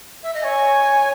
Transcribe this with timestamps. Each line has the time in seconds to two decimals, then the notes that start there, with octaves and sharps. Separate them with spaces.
0.23 E5
0.34 D#5
0.44 C#5 G#5